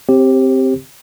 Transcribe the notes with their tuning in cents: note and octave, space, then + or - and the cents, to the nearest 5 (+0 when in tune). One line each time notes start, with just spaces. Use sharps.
C4 +0 G4 +0 C5 +40